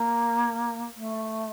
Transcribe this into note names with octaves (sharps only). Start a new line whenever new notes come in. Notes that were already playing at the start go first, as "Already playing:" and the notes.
Already playing: A#3
A3